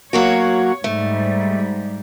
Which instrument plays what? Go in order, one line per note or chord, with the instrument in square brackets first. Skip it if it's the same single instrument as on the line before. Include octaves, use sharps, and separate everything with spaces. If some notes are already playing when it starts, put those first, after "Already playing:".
[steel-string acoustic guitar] F#3 A#3 F#4 [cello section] C#5
[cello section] G#2 G3 [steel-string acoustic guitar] A3